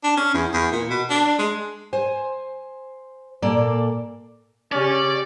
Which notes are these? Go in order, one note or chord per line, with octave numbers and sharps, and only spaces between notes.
D4
C#4
E2
E2
A#2
B2
D4
G#3
C5 G#5
A#2 A#3 A4 D5
C#3 C#4 G4 D5